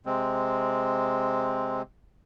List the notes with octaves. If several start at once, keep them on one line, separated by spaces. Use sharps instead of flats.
C3 G#3 C4